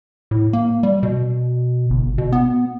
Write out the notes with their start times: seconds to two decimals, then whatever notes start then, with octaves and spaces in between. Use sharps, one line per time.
0.31 A2
0.53 A#3
0.83 G3
1.03 B2
1.90 G1
2.18 B2
2.32 B3